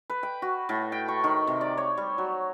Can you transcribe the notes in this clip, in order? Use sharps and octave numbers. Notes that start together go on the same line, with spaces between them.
B4
G5
F#4
A2
G5
C#6
D#3
C3
D5
C#5
G3
F#3